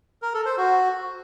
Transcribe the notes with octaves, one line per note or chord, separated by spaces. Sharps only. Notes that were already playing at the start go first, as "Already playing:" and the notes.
A#4
A4
C5
F#4